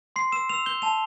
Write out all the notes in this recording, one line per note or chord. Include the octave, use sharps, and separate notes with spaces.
C6 C7
E6 E7
E6 F7
G6 G7
A5 F7